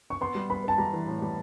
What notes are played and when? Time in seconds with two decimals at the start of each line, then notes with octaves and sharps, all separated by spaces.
0.10 C#6
0.21 B3 C6
0.35 G3
0.50 B3 B5
0.64 B3 A5
0.78 G3 A#5
0.93 E3
1.07 A2
1.22 G3